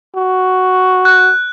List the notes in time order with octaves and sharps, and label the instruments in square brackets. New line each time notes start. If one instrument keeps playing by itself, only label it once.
[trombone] F#4
[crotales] F#6